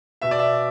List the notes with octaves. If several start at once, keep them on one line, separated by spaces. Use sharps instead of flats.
B2 E5
D5
E5